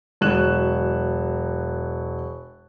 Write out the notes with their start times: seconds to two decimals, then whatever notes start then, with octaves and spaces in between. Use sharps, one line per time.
0.21 E1 F#3 F#6 E7